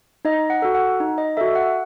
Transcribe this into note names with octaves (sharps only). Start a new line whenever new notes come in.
D#4 D#5
F#5
F#4 A4
F#5
D#4
D#5
F#4 A4 E5
F#5